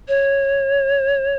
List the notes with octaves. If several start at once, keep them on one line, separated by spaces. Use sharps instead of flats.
C#5